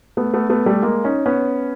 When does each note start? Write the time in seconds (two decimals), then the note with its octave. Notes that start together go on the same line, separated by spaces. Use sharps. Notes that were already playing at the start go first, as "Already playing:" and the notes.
0.17 A3 B3
0.34 A3 B3
0.50 A3 B3
0.66 G3 A3
0.82 G#3 A#3
1.04 C#4 D#4
1.26 B3 C#4